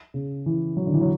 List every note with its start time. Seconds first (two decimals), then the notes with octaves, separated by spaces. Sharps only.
0.14 C#3
0.46 E3
0.77 F#3
0.87 D3
0.94 E3
1.01 F#3